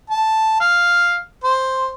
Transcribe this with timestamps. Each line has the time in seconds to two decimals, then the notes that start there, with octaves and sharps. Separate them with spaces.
0.10 A5
0.60 F5
1.44 C5